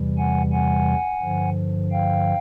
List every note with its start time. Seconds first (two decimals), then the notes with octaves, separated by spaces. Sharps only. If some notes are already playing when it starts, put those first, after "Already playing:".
Already playing: E2 C3 E3 G3
0.18 F#5 G#5
0.52 F#5 G#5
1.22 G2 D3 F3
1.91 F5 G5